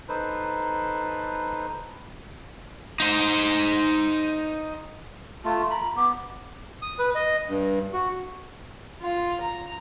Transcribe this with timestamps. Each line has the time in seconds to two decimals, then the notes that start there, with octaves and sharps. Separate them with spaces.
0.09 D#4 A4 B4 C5
3.00 D#4 C5
5.45 A3 F4 A5
5.70 A#5 B5
5.96 B3 D6
6.82 D#6
6.99 B4
7.15 D#5
7.49 G2
7.93 F#4
9.02 F4
9.41 A#5